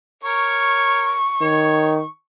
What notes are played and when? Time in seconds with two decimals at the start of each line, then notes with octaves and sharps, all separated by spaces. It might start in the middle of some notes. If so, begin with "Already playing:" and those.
0.24 A#4 C#5 C#6
1.41 D#3 C#5